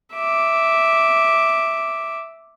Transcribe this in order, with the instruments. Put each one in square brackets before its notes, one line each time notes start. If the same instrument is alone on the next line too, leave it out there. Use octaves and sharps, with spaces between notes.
[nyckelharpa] E5 D6